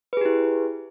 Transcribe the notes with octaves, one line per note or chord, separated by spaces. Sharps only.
E4 G4 G#4 B4